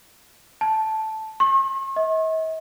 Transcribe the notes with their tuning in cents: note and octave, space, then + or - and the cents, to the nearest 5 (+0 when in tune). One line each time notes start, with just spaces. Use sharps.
A5 -5
C#6 -45
D#5 +45